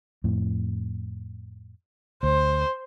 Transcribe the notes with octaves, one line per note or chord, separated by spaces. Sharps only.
F2 A2
D2 C5